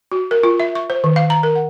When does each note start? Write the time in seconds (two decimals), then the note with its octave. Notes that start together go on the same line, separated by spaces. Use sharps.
0.12 F#4
0.31 A#4
0.43 F4
0.60 E5
0.75 C#6
0.90 C5
1.04 D#3
1.16 F5
1.30 A#5
1.43 A#4
1.55 F#5